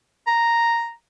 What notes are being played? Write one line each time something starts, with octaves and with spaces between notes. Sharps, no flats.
A#5